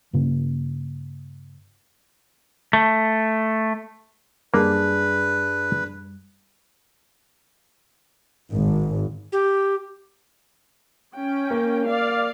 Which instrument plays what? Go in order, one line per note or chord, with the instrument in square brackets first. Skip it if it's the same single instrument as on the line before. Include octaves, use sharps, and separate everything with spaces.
[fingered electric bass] G2 C#3 A#3
[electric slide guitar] A3
[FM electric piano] F#2 G3 [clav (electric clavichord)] A#3 [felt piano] D4 G#4 A5 [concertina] B4
[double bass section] G#1
[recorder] G4
[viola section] C#4 G5
[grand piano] A#3
[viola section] D5 F5